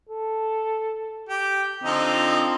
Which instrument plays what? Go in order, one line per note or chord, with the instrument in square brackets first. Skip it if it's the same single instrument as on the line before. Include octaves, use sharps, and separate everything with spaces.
[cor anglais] A4
[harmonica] G4
[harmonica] D3 F3 D#4 [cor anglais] C4